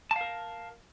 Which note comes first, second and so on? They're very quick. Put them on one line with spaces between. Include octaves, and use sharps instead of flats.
A5 F5 A#4